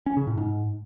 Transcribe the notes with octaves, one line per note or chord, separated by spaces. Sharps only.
C#4
C#3
A2
G#2